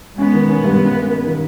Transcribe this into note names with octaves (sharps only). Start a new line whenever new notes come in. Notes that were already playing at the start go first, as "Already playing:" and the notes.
G#3 B3 C#4
D#3
C#4
G2
C#4
A#3
A#3
D#3